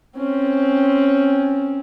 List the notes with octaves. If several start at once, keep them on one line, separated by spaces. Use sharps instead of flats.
C4 C#4